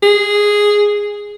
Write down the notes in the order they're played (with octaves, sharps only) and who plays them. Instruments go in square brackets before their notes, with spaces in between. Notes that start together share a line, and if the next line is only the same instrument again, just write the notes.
[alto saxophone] G#4